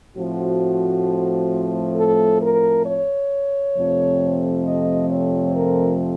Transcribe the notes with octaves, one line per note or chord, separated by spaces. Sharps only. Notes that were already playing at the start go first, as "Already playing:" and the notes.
A2 F3 A3 C4 F#4
A4
A#4
C#5
F2 C3 F3 A3 C4
D#5
C#5
A#4